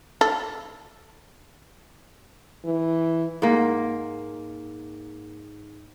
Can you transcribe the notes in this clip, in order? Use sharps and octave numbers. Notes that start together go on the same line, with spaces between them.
A4
E3
G#2 A#3